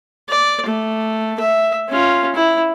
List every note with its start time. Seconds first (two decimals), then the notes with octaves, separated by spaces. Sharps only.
0.29 D5
0.66 A3
1.40 E5
1.89 C#4 F4
2.35 E4